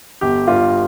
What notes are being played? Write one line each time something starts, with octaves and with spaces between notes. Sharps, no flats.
G1 G4
G2 F4